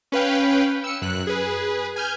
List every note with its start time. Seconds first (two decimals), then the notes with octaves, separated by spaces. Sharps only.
0.12 C#4 B4 F5 G5
0.84 E6 C#7
1.02 F#2 F#6
1.27 G#4 B4
1.96 G#5 F6 G6